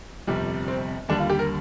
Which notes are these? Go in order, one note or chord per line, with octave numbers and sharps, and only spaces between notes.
G1 F2 C3 G3
C4
D#2 D3 G3 D4
F4
G4
A#4